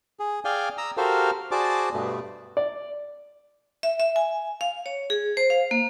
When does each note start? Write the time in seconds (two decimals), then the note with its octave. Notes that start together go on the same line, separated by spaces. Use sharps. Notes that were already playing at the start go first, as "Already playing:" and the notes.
0.20 G#4
0.45 G#4 D5 F5 G5 G#5
0.78 A#5 D#6 E6
0.97 F#4 G4 A4 A#4 C5 F5
1.51 F#4 G#4 C5 D5 A5 D6
1.94 G2 B2 A3 B3
2.57 D5
3.83 E5
4.00 E5
4.16 G#5
4.61 F5
4.86 C#5
5.10 G#4
5.37 C5
5.50 F5
5.71 A#3